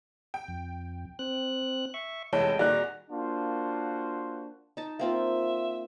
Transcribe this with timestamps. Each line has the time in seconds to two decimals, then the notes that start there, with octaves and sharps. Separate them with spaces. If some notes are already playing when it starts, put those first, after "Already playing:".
0.34 G5
0.48 F2
1.19 C4 F#6
1.94 E5 C#6
2.33 F1 E3 G#3 C#5 D#5 G5 A5
2.59 A#2 D#3 G3 F#4 G#4 D5 A#5 F#6
3.11 A#3 D4 F4 F#4 C5
4.77 D#4 A5
4.99 A#3 C4 F4 E5